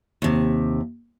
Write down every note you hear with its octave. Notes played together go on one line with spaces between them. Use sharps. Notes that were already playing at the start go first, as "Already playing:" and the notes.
D#2 C3